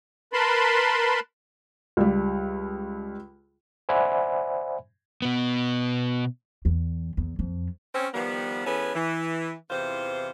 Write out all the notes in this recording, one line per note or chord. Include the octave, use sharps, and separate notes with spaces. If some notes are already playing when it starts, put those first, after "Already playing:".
A#4 B4 A5 B5 C6
C#2 G3
C5 D5 E5 F#5 G#5 B5
B2 B3
E2
E2
F2
C4 C#4
D#3 F3 G3 B3
E3 B3 C#4 G#4 A4 B4
E3
E2 C3 E3 F4 C5